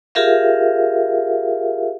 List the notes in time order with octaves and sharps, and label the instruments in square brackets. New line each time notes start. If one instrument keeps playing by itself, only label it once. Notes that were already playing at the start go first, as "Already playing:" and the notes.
[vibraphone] F4 G4 G#4 A#4 E5 F5